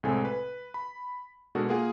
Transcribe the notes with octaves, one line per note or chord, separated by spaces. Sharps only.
C2 A2 G#3 C4 A4 G#5
B4
B5
B2 G#3 D4 F#4 A4 A#4
A#3 F4 G#4 F#5